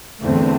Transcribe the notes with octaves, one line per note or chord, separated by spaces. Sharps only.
E2 D3 A3 C4